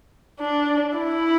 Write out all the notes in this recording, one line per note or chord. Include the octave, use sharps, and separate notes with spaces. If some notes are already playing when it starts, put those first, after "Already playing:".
D4
E4